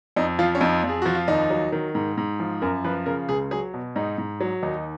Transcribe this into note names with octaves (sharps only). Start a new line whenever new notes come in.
F2 D#4
F3 F4
C#4
F2 D#4
F2
G#4
F3 F#4
F4
D#2 D#4
F#3
D#3
G#2
G#2
F3
F#2 A#4
F3 B4
C#3 A#4
C#2 G#4
F#3 G#4
B2
G#2 D#4
G#2
F#3
D#2 D#4